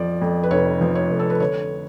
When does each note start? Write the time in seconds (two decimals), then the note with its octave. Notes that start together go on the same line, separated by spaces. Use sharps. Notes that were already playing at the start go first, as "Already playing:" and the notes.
Already playing: F2 F3 D5
0.22 F2
0.43 B4
0.51 F1 C#5
0.81 F3
0.95 C#5
1.10 F1
1.19 A4
1.30 B4
1.40 D3 C#5